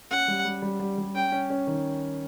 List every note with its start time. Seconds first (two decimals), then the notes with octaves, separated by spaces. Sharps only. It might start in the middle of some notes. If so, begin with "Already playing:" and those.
0.11 C#4 F#5
0.28 G3
0.45 G3
0.62 G3
0.80 G3
0.98 G3
1.14 C#4 G5
1.32 C#4
1.50 C#4
1.67 D#3